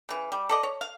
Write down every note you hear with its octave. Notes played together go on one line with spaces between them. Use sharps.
C#3 E3
G3
A4 D5 D#5
C#5
F5